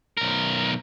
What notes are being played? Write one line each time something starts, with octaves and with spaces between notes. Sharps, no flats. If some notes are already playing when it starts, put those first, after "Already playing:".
B1 A#4